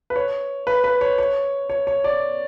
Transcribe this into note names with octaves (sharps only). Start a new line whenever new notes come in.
B4
C#5
B4
B4
C#5
C#5
C#5
C#5
D5